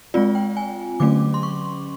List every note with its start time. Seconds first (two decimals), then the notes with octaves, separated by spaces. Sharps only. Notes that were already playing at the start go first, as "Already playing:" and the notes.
0.14 G#3 C4 F4 D5
0.35 G5
0.57 G#5
1.00 D3 F#3 A3 C#4 D6
1.34 C6
1.43 C#6